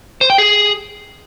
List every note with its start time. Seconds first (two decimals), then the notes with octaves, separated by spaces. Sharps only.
0.21 C5
0.30 G5
0.38 G#4